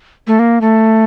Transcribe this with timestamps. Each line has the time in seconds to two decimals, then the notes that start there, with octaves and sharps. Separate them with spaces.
0.27 A3
0.39 A#3
0.61 A3